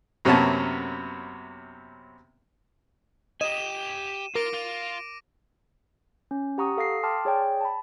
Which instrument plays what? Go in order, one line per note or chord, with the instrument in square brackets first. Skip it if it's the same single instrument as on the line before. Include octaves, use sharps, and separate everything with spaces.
[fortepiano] F#2 C3 A#3 B3 C#4 A5
[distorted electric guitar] G4 G#5 [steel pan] D#5 [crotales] D#7 E7
[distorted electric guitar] F4 [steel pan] A#4 [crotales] D6 A#6 D7
[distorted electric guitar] F4
[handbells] C#4
G4 F#5 A#5 C#6 D#6
A4 F5 D#6 A#6 C7
G5 A5 C6 D6 F6
G#4 C#5 D5 G5
A5 B5